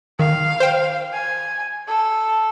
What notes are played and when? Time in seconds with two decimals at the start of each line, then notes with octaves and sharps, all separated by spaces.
0.19 D#3 F5
0.60 C5 G5
1.13 G#5
1.88 A4